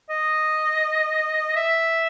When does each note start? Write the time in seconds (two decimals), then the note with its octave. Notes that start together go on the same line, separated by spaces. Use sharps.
0.10 D#5
1.56 E5